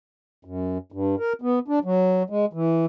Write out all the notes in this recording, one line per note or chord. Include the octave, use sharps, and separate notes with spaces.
F#2
G2
A#4
B3
D4
F#3
G#3
E3